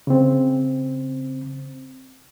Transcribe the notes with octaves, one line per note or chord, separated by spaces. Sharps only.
C#3 C4